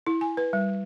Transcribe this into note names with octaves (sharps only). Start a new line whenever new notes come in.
E4
G#5
B4
G3